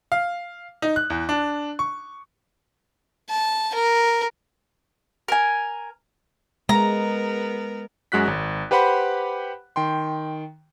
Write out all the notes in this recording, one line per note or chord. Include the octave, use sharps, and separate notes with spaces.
F5
D#4
F#6
E2
D4
C#6
A5
A#4
A#4 G#5
G#3 B3 A#4 A#5
F#2 G#3 F#4 F#6 B6
G#1
G4 B4 C5 F#5 B5
D#3 G5 C6